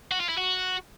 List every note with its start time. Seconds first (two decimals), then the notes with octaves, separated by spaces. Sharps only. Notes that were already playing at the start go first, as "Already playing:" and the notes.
0.11 F#4
0.20 F4
0.29 E4
0.37 F#4